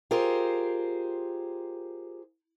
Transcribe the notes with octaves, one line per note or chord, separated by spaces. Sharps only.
F4 G4 G#4 A#4 C5